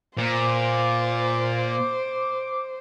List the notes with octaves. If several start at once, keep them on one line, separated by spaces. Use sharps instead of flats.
A#2 C5 D6